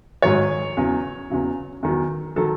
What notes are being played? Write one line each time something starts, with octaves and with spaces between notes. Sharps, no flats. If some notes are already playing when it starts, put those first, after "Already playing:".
G#2 D#3 F#3 C#5
E2 C#3 F#3
E2 C#3 F#3
E2 D#3 F#3
D#3 F#3 A4